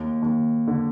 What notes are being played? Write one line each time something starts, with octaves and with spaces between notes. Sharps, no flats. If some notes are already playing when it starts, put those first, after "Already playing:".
Already playing: D#2
D#2
D3